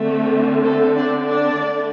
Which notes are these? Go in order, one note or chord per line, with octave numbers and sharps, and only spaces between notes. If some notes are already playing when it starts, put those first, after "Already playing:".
Already playing: D3 A3 C4
A3 A4
D4 D5
D4 D5
D3 A3 D4